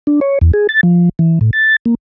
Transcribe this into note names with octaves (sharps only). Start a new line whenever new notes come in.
D4
C#5
E2
G#4
A6
F3
E3
A2
A6
A#3